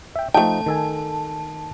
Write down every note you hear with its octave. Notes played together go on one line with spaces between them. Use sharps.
E5 G5
F3 A3 D#4 G5 A5
D#3 A4 G#5